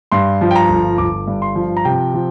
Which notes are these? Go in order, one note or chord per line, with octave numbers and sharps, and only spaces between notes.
G2 C6
F3
G5
A#5
G1
G1 D6
G2
C6
F3
A#5
C3 G5
F3